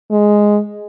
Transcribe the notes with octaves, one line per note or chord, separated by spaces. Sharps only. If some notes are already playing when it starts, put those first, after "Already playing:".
G#3